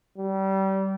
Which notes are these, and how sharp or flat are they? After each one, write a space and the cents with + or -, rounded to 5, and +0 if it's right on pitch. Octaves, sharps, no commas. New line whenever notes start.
G3 -30